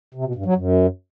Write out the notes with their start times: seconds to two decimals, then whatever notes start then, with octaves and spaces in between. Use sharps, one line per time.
0.14 C3
0.25 B2
0.35 G2
0.46 F#3
0.56 F#2